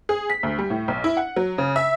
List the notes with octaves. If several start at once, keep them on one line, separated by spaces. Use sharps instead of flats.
G#4
B6
D2
G3
A2
B1
E4
F#5
F#3
C#3
E5